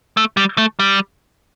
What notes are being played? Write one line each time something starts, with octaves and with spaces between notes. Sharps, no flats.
A3
G3
A3
G3